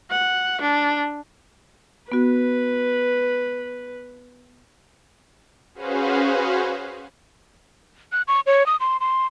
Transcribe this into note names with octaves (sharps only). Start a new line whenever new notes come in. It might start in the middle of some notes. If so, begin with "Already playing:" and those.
F#5
D4
B3 F#4 B4
C#4 F#4 G#4 B4 C5 F5
F#6
C#6
C#5
D#6
C6
C6